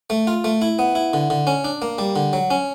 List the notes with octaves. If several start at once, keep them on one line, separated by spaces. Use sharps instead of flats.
A3
F4
A3
E4
B3
E4
D3
D3
C#4
D4
A#3
G3
D3
F#3
C#4